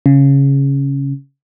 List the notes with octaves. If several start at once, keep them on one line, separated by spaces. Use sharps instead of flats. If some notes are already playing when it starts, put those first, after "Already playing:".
C#3